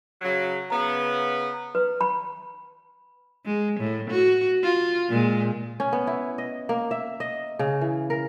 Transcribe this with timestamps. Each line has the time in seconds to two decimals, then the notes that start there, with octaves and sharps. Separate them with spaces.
0.22 C#3 F#3
0.70 C#3 B3 A#5
1.75 B4
2.01 B5
3.46 G#3
3.80 A2
4.10 F#4
4.64 F4
5.09 A#2 G#3
5.80 C#4
5.93 B3
6.07 E4
6.38 D#5
6.69 A#3
6.91 E5
7.20 D#5
7.59 C#3
7.81 E3
8.10 A#4